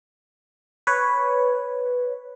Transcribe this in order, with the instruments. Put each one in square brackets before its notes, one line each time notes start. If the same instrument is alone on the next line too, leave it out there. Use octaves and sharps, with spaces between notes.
[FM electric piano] B4 C#5